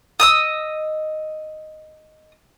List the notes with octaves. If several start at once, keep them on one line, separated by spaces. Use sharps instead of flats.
D#5 D#6 E6